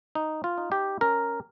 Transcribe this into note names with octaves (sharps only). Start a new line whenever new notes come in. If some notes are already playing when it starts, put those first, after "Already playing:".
D#4
F4
D#4
G4
C#4 A#4